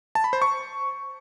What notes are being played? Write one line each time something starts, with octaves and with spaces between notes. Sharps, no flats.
A5
B5
C5
C#6